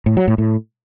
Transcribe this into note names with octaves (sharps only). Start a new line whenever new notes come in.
A2
F#3
A2
A2